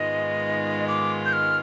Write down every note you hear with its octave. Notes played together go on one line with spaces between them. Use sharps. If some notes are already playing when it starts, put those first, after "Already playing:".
Already playing: G#2 D#3 G#3 B3 F4 D#5
D6
G6
F6